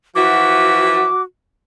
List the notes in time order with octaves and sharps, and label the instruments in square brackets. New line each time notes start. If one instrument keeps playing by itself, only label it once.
[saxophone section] E3 F3 E5 [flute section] F#4 [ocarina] D6